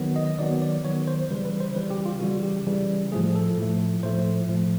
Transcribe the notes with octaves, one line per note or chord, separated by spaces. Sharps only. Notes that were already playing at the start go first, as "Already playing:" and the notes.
Already playing: D#3 F#3 B3
D#5
D#3 F#3 B3 D5
D5
D#3 F#3 B3 C#5
C5
C#3 E3 G3 B4
B4
C5
C#3 E3 G3 B4
G4
F4
C#3 E3 G3 F#4
G4
C#3 E3 G3
A2 F3 A3 G#4
A4
A2 F3 A3
A2 F3 A3 C5
A2 F3 A3